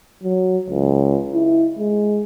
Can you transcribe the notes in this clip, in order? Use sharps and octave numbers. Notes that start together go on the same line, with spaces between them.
F#3
C#2
E4
G#3